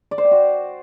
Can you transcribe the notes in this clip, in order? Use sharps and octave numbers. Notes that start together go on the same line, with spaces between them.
D5
C5
G5
F#4